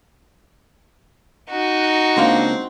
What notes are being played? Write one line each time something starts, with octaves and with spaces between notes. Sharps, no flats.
D#4 F#4
C#2 A#3 C4 D4 F5